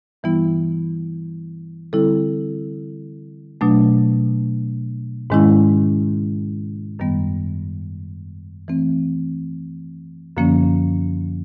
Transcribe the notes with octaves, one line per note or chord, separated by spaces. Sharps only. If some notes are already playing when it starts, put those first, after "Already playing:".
G2 E3 G3 B3 E4
D3 G3 C4 E4 A4
B2 F#3 A3 D4
G#2 D#3 G#3 C#4 E4
F#2 D#3 G3 B3
E3 A3 C4
F#2 D3 F3 A#3 C#4